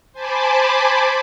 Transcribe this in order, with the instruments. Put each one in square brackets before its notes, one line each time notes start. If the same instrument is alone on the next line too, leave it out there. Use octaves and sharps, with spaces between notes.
[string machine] C5 G#5 A5 B5 D6